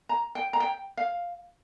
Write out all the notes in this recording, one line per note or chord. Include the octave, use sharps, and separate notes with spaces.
A#5
G5
A#5
G5
F5